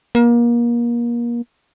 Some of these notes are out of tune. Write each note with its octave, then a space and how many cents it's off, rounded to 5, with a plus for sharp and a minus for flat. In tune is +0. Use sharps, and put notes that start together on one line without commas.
A#3 +30